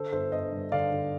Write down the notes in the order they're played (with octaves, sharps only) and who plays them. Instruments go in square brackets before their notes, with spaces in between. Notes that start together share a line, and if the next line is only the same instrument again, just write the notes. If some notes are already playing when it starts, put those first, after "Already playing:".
Already playing: [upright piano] D3 A4 C5
G1 A4 C5
G1 C5 D#5
G2
D3 D5 F5
D3